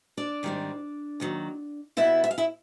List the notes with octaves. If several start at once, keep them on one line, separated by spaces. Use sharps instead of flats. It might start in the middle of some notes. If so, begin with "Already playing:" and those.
D4 D5
G#2 D#3 G3 C4
D#2 D#3 F#3
B2 G3 B3 E4 E5
E5
F5
E4 E5